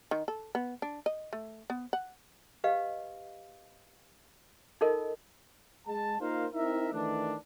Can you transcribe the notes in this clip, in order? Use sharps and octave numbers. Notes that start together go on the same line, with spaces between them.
D#3
A4
B3
D4
D#5
A3
B3
F#5
G4 B4 D#5 F5
D#4 F4 A4 A#4 D#5
G#3 A5
A#3 D#4 F4 A#4 C5 F5
C4 D#4 E4 A#4 E5
D#3 E3 A3 D4